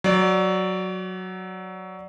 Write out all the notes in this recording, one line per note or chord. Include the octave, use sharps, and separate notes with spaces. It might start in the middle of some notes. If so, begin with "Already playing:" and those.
F#3 D5